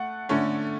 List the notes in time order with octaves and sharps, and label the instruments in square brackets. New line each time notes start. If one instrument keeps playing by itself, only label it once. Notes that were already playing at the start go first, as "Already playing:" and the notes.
Already playing: [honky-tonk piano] A3 F#5
D3 A3 C#4